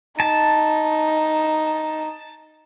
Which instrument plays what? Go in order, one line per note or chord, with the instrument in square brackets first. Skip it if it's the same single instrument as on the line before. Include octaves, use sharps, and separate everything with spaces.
[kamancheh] D#4 [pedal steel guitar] A5